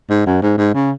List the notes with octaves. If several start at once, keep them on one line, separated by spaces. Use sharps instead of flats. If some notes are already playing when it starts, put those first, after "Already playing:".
G#2
F#2
G#2
G#2
C#3